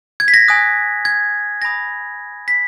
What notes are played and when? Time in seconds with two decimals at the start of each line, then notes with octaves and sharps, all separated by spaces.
0.20 G#6
0.28 B6
0.34 A#6
0.48 G#5 D#6 F#6
1.05 G#6
1.62 G#5 B5 D#6 A#6
2.48 B6